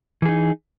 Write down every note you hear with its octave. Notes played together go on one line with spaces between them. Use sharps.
E3 D#4 G#4